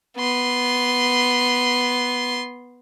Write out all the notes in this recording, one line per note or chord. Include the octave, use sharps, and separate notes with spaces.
B3 C6